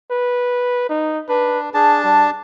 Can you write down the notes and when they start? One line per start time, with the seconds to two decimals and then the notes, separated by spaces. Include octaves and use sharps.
0.11 B4
0.90 D#4
1.29 D4 B4
1.74 D4 G#4 A5
2.04 G3